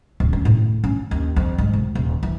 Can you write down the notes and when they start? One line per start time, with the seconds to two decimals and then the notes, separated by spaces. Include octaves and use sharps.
0.20 D1
0.33 C#4
0.45 A2
0.84 C#4
1.11 D#2
1.36 F2
1.58 G#2
1.73 E1
1.95 D#1
2.23 E3